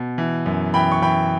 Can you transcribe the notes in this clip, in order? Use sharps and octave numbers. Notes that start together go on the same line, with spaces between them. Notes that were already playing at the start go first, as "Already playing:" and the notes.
Already playing: B2
E3
F#2
E3 G5 B5
C#6
E3 G5 B5